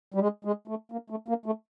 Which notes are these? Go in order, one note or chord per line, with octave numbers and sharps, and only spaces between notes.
G3
G#3
G#3
A3
A#3
A3
A#3
A3